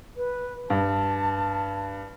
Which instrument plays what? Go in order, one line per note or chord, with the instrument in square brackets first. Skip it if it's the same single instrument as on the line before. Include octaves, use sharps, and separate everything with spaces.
[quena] B4
[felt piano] G2 [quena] A5